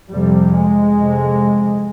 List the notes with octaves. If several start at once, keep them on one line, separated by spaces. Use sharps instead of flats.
F2 C3 G3
G#3
F2 C3